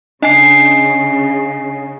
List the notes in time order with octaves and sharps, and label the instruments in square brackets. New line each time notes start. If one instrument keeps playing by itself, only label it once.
[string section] C#3 [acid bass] D4 [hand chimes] D#5 G#5 C7